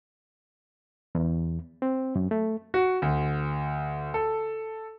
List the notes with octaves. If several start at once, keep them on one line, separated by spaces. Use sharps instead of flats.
E2
C4
F#2
A3
F#4
D2
A4